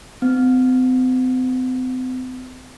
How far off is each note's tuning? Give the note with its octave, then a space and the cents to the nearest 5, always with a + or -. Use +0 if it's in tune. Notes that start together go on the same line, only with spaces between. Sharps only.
C4 -40